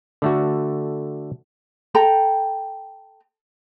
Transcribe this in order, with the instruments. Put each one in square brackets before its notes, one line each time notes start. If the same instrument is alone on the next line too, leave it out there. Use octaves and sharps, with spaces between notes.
[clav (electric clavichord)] D3 A3 F#4
[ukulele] A4 G5 A#5